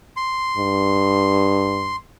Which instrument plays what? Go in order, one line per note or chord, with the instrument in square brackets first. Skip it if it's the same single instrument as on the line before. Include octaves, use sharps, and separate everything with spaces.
[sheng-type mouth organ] C6
[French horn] G2